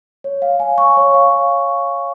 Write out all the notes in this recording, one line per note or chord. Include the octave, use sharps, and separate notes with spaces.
C#5
F5
G#5
C#6
C#5
F5